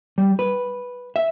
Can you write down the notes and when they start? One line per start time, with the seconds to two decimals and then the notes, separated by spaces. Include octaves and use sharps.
0.18 G3
0.39 B4
1.16 E5